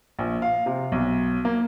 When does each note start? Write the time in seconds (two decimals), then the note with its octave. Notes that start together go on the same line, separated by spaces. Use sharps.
0.19 A#1
0.42 F5
0.66 C3
0.92 B1
1.45 A#3